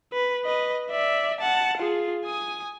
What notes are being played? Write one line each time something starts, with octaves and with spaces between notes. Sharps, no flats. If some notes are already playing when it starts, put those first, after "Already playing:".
B4
B4 D#5
D5 E5
F#5 A5
F4 G#4
G#5 D#6